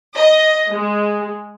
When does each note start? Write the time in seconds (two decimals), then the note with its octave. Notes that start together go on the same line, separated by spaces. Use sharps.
0.16 D#5
0.70 G#3